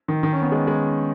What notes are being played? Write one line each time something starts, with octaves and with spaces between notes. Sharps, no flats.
D#3
D#3
C#4
B3
G#3
G#3